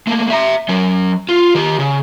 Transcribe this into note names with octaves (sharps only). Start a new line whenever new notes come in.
A3 A#3
E5 A#5
F#3 C#4
F4
D#3 G4
C#3